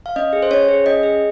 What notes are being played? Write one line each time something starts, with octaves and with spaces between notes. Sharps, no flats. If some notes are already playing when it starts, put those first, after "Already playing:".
F5
C#4 D#5
G#4
C5
C#4 C#5
G#4
C#4 D#5
G#4